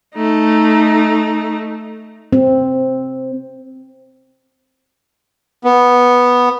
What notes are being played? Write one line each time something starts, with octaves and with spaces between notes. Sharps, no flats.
A3 D#4
C4
B3